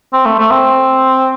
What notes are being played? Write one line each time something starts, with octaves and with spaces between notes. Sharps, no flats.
C4
A3
A3
C4